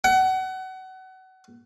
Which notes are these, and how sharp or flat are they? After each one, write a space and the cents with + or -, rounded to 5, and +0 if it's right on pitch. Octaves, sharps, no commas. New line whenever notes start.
F#5 +30